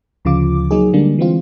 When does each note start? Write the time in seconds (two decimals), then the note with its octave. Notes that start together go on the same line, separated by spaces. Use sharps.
0.25 D2 C#3 F3 F4 D6
0.71 F#3 A#3 D#4 G#4
0.93 D3 G3 G#3 A#3 D4
1.18 E3 G#3 C4 F4